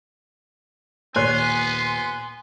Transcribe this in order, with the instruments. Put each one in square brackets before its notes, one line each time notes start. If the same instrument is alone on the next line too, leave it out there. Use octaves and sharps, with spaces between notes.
[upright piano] D#1 C#5 F#6 [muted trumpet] B3 [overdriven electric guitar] G#5 [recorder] C6